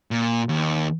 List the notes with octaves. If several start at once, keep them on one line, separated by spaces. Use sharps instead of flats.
A#2
D#2